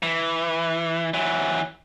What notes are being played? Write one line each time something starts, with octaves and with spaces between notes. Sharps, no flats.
E3
E3 F#3